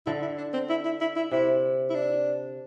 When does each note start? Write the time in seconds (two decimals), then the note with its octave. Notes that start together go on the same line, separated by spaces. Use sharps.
0.06 D3 E4
0.22 E4
0.38 D4
0.53 C4
0.70 E4
0.85 E4
1.01 E4
1.16 E4
1.31 C3 E4
1.90 E4
1.95 D4